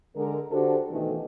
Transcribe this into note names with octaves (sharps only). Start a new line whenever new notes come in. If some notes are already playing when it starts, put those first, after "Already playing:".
D3 G#3 A#4
D3 D4 F#4 G4 A4 C5
B2 D#3 E3 A3